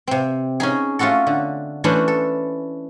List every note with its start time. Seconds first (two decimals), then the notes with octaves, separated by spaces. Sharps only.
0.07 C3 C4
0.60 C#4 D#4 G#4
0.99 A3 C#4 F4 F#4 A4
1.27 D3
1.84 E3 A3 C#4 D4 E4 C5
2.08 A4